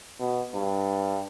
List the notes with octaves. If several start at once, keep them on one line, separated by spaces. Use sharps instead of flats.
B2
G2